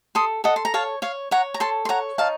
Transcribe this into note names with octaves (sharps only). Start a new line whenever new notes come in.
A4 C6 D#6
A4 D#5 F#5
C6
A#5
C#5 F5 A5
C#5 F5
C#5 F#5 A#5
A#5
A4 A5 C6
C6
C#5 F#5 A#5
D#4 F5 A5